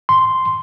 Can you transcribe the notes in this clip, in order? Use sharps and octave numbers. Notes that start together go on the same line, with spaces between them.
C6